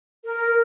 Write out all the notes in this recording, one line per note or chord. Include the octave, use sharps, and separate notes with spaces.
A#4